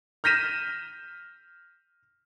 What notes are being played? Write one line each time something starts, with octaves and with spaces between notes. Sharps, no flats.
F6 G6 A#6 B6 D#7 E7